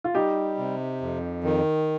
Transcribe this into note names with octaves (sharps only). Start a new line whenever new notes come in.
F4
G3 D#4 G4
C3
F2
D#3